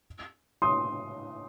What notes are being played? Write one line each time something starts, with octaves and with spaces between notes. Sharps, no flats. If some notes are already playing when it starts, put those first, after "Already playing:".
C6 D#6